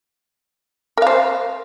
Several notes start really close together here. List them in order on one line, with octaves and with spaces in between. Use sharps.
A#4 F5 C5